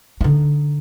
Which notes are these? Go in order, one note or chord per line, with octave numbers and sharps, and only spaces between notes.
D3 D#4